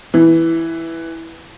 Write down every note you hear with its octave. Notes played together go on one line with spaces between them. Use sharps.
E3